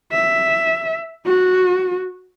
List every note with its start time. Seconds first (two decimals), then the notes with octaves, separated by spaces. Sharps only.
0.13 E5
1.26 F#4